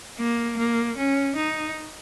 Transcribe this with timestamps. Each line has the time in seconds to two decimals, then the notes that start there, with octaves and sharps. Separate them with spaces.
0.19 A#3
0.57 A#3
0.97 C#4
1.36 D#4